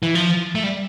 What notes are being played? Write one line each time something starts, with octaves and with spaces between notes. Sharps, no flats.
E3
F3
A3
G3